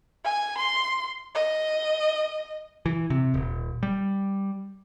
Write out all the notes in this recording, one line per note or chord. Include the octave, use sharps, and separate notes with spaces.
G#5
C6
D#5
E3
C3
D#1
G3